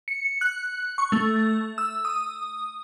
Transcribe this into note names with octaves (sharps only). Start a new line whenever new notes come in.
C#7
F#6
C#6
A3
E6
D#6